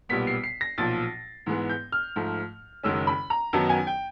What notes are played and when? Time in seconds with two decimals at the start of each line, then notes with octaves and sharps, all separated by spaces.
0.09 B1 A#2 G3 B3 B6
0.27 C7
0.44 C7
0.61 A#6
0.78 B1 A#2 F3 A6
1.46 G#2 E3 G#3 B3
1.69 G6
1.92 F6
2.16 G#2 F3 A3
2.83 F#1 F#2 D#3 G#3 C#4 E6
3.07 B5
3.30 A#5
3.53 F#2 D#3 F#3 B3 D#4 A5
3.69 G#5
3.87 G5